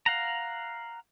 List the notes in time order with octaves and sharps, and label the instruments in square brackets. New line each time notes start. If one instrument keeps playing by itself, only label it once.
[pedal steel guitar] F5 F#5 A#5